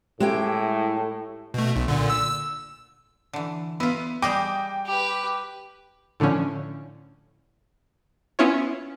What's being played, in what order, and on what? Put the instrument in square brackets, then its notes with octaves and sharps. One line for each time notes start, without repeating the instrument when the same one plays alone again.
[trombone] A2 [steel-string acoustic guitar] G#3 E4 G5 [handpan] G4
[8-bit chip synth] B2 A3
B1
A#2 D3
E6
[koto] D3 E3
[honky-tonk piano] B3 [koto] E4 F4
[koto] G3 G#4 D#5 [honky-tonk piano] G5 D6
[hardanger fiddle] G4 B4
[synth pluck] A2 D3 F3 C#4
B3 C#4 E4 F4 C#5